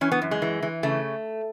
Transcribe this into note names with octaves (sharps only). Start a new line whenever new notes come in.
E3 C#4
B3
F#2
G#3
E3
E3
C#3 A3